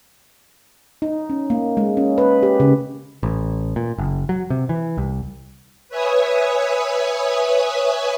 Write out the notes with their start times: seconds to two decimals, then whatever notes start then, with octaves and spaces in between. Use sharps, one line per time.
1.02 D#4
1.30 C#4
1.50 A#3
1.77 G#3
1.97 C#4
2.18 B4
2.43 G4
2.60 C#3
3.23 A1
3.76 A#2
3.98 F#1
4.29 F#3
4.50 C3
4.69 E3
4.98 C2
5.89 B4 C#5 E5 G#5 D#6